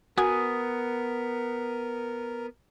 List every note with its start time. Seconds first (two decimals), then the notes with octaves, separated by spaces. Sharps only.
0.18 B3 F#4 A#4 G#5 D#6